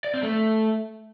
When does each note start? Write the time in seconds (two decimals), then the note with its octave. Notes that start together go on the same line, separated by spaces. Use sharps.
0.04 D5
0.14 C4
0.23 A3